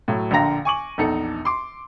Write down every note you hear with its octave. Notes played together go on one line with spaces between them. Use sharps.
A2 F#3
A#1 D3 F5 G5 A#5 A#6
G#5 C#6 D6 F#7
A#1 E2 D#4 A4 C#7
C6 D6